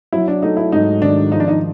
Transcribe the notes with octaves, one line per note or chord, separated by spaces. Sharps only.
F#3 E4
D4
A3 D#4
E4
G#2 D#4
D#3 D4
F3 D#4
D4
D#4